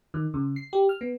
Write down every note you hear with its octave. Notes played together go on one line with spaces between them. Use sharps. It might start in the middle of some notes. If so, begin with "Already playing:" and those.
D#3
C#3
C7
G4
F6
B3